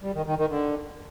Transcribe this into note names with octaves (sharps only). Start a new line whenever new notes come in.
G3
D#3
D#3
D#3
D3